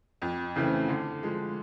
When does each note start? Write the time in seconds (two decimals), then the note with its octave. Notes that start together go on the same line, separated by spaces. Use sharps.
0.22 F2
0.56 C#3 E3 A3 C4
0.88 D3
1.23 F3 G#3